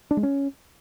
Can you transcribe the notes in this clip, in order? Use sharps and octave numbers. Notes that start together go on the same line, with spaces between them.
D4
G#3
C#4